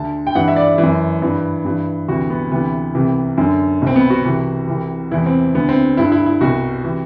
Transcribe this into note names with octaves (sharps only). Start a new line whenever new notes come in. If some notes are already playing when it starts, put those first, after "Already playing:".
Already playing: D2 D3 A5
G5
G2 E3 F#5
E5
D5
E3
F#2
G2 E3
G2 E3
D2 C3 E3 F#4
B3
D2 C3 E3 B3
C2 C3 E3
F#2 D3
C2 B2 C4
B3
F#4
C2 C3 E3
C2 C3 E3
E2 C3 E3 E4
C4
D2 D3 B3
C4
G2 D3 E4
E4
E4
C2 B2 F#4
C3 E3